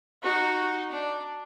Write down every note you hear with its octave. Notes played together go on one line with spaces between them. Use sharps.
D#4 F#4
D4